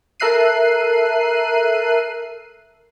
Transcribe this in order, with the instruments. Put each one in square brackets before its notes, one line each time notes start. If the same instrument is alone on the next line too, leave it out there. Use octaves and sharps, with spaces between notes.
[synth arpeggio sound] A4 A#4 E5 F#6 C7 D#7